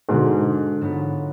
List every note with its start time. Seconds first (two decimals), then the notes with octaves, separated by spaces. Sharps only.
0.09 G#2 B2 D3 G#3 D4
0.81 G#2 F#3 B3 F4